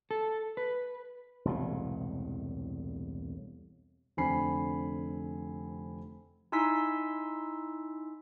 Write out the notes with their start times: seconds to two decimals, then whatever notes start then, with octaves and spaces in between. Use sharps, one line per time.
0.11 A4
0.57 B4
1.45 E1 C2 A2
4.17 F1 D3 C4 G#5 B5 C7
6.52 D#4 E4 G#5 C6 E6 B6